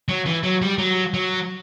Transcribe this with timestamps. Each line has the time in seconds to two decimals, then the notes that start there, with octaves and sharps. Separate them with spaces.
0.09 F#3
0.26 E3
0.43 F#3
0.62 G3
0.78 F#3
1.14 F#3